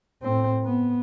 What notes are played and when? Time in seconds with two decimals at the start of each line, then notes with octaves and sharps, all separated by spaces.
0.22 A2 C4
0.64 B3